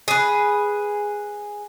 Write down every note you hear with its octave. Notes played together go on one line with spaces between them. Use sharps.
G#4 B4